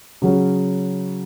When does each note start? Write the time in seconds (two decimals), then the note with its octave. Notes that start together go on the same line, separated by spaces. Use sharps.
0.22 C#3 F#3 C#4 F#4